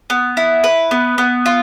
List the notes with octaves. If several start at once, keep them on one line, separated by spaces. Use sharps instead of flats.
B3
E4
B4
B3
B3
F4